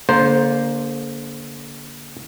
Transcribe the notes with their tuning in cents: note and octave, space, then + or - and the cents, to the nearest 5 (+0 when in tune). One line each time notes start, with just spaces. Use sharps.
D3 -30 A#3 +5 C5 +0